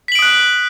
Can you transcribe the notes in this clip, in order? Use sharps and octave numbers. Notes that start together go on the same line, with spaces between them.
D#6 F#6 B6 D7 F#7